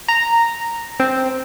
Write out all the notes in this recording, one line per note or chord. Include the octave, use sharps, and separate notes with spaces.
A#5
C4